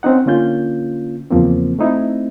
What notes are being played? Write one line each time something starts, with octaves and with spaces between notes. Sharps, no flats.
C4 C#4 D#4 F#5
D3 A#3 C#4 F4 G6
E2 C#3 F3 A#3 C4
A3 C4 D#4 E4